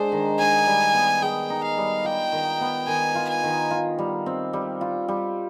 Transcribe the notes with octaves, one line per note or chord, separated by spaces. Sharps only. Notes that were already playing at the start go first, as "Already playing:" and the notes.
Already playing: G#3 D4 G#4 C5
D#3
D#4 G#5
G3
B3
G#4 G5
D#4
F5
G3
F4 G5
D#3
B3
D#3 G#5
F4
G#5
D#3
F4
G3
C4
G3
F4
G3